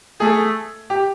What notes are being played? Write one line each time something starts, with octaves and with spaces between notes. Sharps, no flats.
A3 G#4
G4